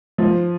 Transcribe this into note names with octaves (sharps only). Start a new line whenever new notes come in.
F3